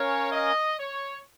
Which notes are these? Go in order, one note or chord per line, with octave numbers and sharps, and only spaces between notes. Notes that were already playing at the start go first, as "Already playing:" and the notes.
Already playing: C#4 A#4 C#5 F5 G#5
D#5
C#5